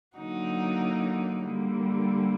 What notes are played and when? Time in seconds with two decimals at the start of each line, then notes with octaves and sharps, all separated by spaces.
0.17 D3 F#3 A#3 D#4 F#4
1.44 D3 G3 A#3